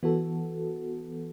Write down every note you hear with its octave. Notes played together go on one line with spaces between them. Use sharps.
E3 B3 F#4 A4